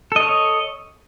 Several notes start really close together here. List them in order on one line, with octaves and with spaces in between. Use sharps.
A4 D#5 C#5